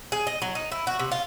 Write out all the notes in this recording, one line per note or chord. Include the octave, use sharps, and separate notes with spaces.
G#4
D#5
F#3
D#4
E4
F#4
C3
F4